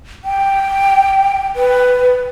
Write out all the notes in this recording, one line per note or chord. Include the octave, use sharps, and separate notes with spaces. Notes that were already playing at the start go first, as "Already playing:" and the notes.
G5
B4